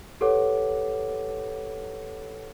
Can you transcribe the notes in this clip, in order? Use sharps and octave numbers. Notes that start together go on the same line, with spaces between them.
G4 A4 B4 C#5 F#5 D6